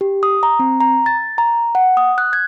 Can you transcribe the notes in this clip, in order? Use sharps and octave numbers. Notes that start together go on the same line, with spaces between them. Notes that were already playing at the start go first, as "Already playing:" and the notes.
G4
D#6
A#5
C4
A#5
A6
A#5
F#5
D#6
F#6
G#6